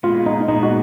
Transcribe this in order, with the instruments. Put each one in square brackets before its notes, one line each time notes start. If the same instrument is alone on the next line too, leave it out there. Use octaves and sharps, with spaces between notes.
[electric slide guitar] A#2 G#3 B3 [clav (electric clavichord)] F4
[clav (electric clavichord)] D#4
[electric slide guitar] A#2 G#3 B3 [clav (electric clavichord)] D#4
[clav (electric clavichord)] F#4